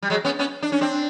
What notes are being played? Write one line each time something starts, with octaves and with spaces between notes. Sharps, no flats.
G3
F#3 G#3
B3 C#4
B3 C#4
D4
C#4
C4 D4